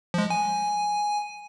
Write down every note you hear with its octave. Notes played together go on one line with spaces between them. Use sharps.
F3 G#3
G#5